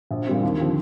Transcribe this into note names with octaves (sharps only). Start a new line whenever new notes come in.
A#1
A#2 G3 C4
D#2
D3 F3 C4